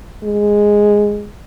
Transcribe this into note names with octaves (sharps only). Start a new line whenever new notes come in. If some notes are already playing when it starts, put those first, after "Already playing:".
G#3